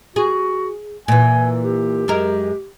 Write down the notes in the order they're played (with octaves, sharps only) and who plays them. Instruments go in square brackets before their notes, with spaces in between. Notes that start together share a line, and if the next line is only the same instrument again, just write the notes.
[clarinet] F#4 [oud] G#4
[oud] A#2 E3 [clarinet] G#5
[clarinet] G4
[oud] F#2 G#3 A#4